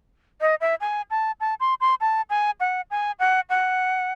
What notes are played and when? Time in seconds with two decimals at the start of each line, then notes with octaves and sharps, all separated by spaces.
0.41 D#5
0.61 E5
0.81 G#5
1.11 A5
1.40 A5
1.60 C6
1.81 C6
2.01 A5
2.30 G#5
2.60 F#5
2.91 G#5
3.20 F#5
3.50 F#5